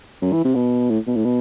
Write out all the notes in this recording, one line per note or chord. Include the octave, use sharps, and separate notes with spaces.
F#2
E3
C3
B2
A2
B2
A2
B2